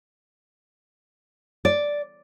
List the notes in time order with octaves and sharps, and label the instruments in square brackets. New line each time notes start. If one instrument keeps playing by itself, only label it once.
[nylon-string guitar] D5